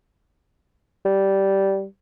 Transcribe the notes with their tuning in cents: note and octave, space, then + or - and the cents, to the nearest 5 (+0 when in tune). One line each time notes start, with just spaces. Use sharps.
G3 -10